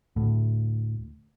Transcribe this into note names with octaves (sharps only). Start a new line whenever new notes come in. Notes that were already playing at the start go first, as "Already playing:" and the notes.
D2 A2